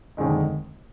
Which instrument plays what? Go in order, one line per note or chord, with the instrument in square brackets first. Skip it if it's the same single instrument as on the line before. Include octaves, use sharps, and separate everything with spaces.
[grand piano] F1 D#2 D3 G#3 D#4